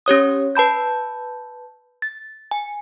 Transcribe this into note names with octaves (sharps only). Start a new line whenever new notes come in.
C#4 G4 C#5 D#6
B4 A5 B5 G6
A6
G#5